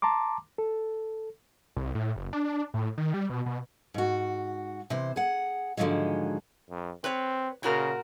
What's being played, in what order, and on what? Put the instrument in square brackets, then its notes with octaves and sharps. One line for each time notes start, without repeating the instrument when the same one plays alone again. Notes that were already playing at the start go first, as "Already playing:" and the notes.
[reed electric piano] A5 A#5 C6 D6
A4
[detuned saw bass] C2
A2
F#1
D4
A2
D#3
G3
B2
B2
[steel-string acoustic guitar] G#2 F#4
C3 E3 C5
G#4 F#5
G#2 D3 D#3 F3 F#3 G#3
[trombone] F2
[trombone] C4 [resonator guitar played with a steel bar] B4 C#5
[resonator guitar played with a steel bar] A#2 F#4 A#4 [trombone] C#3